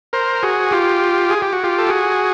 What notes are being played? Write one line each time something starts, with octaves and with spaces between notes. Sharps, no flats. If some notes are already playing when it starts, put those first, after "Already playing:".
A#4 C5
F#4 G#4
F4 G4
G#4
G4
F#4
F4 G4
A4
F#4 G#4